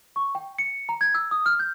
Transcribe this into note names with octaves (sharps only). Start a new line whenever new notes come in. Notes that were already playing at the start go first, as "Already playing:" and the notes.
C#6
G5
C#7
A#5
G#6
E6
D#6
F6
G6